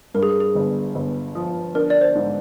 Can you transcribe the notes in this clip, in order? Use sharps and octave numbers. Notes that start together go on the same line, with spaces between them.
G2 A#4
G#4
G#4
G1
G1
F3
D4 A#4
D5
C5
G#2